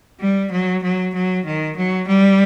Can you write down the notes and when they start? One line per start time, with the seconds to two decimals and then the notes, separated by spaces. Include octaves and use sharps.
0.20 G3
0.51 F#3
0.83 F#3
1.14 F#3
1.45 D#3
1.77 F#3
2.08 G3